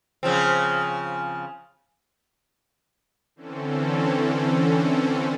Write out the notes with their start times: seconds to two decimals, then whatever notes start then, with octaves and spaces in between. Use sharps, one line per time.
0.23 C#3 F3 C4
3.36 D3 E3 C4 C#4 A4